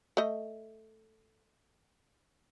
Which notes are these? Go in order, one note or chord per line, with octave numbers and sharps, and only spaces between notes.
A3 D#5